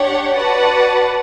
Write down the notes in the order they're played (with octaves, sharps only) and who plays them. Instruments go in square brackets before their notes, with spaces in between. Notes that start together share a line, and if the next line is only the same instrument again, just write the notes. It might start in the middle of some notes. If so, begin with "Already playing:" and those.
Already playing: [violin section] D4 G4 C#5 F#5
F#4 B4 D5 F#5 A5